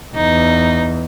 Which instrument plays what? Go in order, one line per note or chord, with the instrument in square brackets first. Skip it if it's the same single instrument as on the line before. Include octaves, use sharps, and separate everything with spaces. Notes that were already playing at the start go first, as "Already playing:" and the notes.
[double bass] E2 [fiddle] D#4